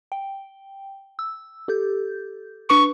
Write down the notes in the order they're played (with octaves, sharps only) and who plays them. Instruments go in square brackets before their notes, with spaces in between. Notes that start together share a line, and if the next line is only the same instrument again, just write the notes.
[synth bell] G5
E6
G4 A4 G6
[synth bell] D4 B4 D6 [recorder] C#6